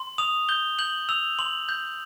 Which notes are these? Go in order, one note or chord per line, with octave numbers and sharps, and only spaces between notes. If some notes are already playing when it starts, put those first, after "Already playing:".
Already playing: C6
D#6 F7
G6 G7
G6 F#7
E6 F7
C6 F#7
G6